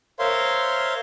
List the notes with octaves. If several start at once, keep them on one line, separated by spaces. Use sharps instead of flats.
A#4 C5 C#5 E5 F5 C6